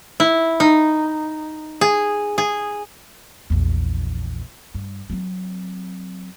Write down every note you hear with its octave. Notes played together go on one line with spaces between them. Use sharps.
E4
D#4
G#4
G#4
A#1 E2
G2
F#3 C4